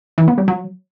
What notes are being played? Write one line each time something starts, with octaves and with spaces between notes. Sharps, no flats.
E3
B3
G3
F#3